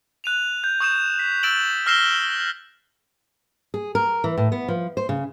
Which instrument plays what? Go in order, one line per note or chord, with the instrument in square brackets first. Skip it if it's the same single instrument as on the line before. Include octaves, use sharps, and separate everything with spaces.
[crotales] F#6 D#7 F7
G6
C#6 D#6 G6 D#7 E7
B6
E6 A6 D7 E7 F#7
E6 F6 A#6 C7 E7 G7
[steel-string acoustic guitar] G#4
A#4
E3
A2
B3
F3
C5
C#3